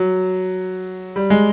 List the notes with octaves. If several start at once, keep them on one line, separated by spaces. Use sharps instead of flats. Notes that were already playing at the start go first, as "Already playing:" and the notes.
Already playing: F#3
G3
G#3